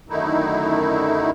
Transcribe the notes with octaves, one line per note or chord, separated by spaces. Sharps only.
F#2 D3 D#3 A3 D#4 E4